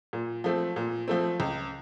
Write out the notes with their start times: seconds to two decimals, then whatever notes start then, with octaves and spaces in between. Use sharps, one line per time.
0.13 A#2
0.44 F3 A3 C4
0.76 A#2
1.08 F3 A3 C4
1.40 C#2